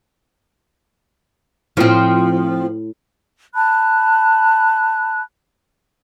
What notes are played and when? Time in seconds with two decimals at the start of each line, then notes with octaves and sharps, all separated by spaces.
1.77 A2 F3 C4
3.54 A5 B5 F#6